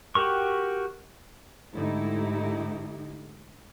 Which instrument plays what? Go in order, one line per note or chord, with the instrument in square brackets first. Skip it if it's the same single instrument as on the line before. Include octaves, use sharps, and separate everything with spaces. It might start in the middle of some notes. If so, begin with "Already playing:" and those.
[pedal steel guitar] F#4 G4 A#4 C#6
[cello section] G#2 D3 A3 D#4 E4 G4